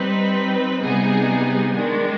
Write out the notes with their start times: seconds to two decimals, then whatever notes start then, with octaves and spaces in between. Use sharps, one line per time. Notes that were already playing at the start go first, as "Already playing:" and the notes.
Already playing: G3 C4 D#4 B4
0.81 C3 G3 B3 D#4 G#4
1.75 D#3 G#3 D4